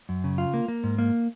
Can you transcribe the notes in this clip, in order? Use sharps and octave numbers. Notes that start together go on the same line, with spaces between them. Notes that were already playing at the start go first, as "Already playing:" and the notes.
F#2
C#3
F4
A#3
A#3
G#2
A#3